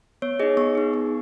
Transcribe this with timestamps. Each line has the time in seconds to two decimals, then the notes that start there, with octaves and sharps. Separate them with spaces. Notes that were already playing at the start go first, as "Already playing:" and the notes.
0.22 B3 C#5
0.40 D#4 G#4 D#5
0.57 B3 C#6
0.75 D#4 G#4
0.93 B3